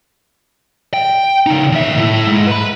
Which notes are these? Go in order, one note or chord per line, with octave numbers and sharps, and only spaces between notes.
G5
C#3 D#4
D#2 E5
A2 E4
G#2
B4 B5